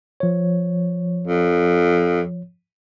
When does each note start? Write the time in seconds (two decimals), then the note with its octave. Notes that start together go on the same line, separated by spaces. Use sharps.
0.20 F3 C#5
1.27 F2